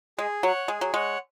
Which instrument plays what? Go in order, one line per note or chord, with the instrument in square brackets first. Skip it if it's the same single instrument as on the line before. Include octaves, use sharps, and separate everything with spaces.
[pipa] G#3 [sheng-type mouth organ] G#4
[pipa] F#3 [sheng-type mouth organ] C#5 F#5
[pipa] G#3 [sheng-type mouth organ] G#4
[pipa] F#3
[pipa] G#3 [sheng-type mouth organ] C#5 F#5